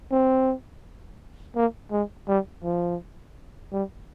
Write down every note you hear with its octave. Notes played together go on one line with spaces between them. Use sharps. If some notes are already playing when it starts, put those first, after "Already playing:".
C4
A#3
G#3
G3
F3
G3